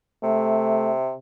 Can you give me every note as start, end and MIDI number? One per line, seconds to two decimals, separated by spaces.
0.23 1.15 48
0.23 0.91 57